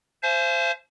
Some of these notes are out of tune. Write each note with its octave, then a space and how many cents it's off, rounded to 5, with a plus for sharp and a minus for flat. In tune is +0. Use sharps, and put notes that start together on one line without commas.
C5 +0 F5 -45 G#5 +45